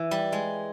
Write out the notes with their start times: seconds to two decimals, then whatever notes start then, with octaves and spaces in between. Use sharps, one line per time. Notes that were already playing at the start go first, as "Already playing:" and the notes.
Already playing: E3
0.11 G3
0.32 G#3